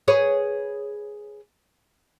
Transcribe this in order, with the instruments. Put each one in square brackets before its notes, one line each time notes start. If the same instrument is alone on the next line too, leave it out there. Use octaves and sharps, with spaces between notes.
[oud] G#4 B4 C#5